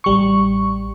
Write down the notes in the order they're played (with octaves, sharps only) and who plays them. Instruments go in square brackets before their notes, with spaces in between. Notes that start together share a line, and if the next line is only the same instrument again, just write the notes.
[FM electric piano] A1 G3 C#6